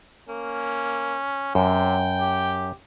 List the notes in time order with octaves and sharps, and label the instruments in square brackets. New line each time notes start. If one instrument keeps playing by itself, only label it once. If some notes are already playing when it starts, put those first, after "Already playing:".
[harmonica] A#3 [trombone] C#4
[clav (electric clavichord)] F#2 [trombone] C3 [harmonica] G5
[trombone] G4